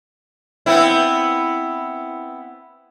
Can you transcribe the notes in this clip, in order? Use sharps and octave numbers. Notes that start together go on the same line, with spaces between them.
B3 C4 E4